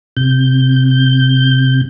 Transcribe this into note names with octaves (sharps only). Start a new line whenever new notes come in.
C3 G6